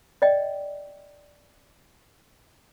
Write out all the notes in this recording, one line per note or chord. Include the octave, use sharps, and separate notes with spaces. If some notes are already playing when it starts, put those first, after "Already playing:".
D5 D#5 G5